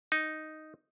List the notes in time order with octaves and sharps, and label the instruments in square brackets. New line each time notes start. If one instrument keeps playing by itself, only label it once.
[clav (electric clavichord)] D#4